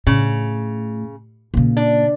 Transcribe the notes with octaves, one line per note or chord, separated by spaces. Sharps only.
A2 C#3
A#2 C#3
D4